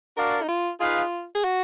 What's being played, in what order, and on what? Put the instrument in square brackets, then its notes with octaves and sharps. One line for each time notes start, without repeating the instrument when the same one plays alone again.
[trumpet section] D4 F#4 D5 F5 [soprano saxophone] A#4
[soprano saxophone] D#4
F4
[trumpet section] D#4 G#4 B4 F5 [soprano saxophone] F4
[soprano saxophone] G#4
F#4